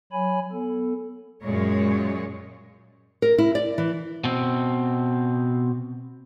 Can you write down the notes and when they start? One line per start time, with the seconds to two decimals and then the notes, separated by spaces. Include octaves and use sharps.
0.12 F#3 C#5 G#5 B5
0.52 B3 A4
1.42 F#2 A#2 G#3 C#5
3.22 A#4
3.38 E4
3.55 D5
3.78 E3
4.24 B2 C4